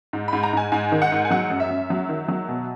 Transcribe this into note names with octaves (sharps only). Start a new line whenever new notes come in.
G#2
G#2 B5
A#5
G#2 G#5
G#2 G#5
D#3
F#5
G#2
G#5
F#3 F#5
F#2
E5
F#2
F#3
D#3
F#3
B2